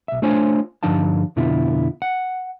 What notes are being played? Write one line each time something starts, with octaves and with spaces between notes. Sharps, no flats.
B1 E5
A3 D4 F4 C5 C#5 G#5
G2 D3 F3 D#4 F5 A5
F2 B2 D3 E4 F4
F#5